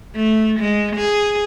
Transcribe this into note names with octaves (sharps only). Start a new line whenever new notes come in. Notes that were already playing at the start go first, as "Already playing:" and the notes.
A3
G#3
G#4